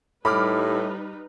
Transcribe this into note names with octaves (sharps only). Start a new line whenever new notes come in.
A2 G3 D#4 B4 B5 D6 F6